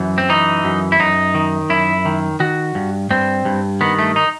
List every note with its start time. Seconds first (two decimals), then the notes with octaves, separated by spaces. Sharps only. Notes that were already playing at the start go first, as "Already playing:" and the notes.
Already playing: F#2 E3
0.18 C4
0.29 E3 D#4
0.64 F#2
0.92 E4
1.00 F#2 D#4
1.34 D#3
1.70 F#2 E4
2.05 D#3
2.40 D#3 F#4
2.75 G2
3.10 G2 C4
3.45 G2
3.81 D#3 B3
3.99 A3
4.16 D#4